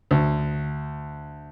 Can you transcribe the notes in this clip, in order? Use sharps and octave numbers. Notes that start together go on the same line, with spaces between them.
D2